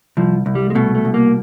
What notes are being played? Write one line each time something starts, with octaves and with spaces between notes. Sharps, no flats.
C2 F3
C2
G3
G#3
B2 A3
A3
C2
A#3